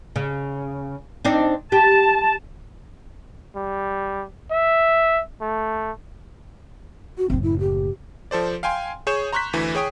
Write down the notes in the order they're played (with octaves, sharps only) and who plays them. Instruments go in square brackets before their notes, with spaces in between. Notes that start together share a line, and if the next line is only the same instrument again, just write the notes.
[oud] C#3
C4 D4 D#4
[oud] G4 [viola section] A5
[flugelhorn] G3
E5
A3
[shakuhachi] F#4
[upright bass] F#1 A2 [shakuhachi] C4
[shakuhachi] E4
G4
[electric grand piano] F3 A4 C5 D5
F5 G5 G#5 C6
G#4 C#5 C#6 G6 E7
A#5 C6 C#6 F#6 G6 B6
D2 E3 E4
G#4 C#5 G5 D#6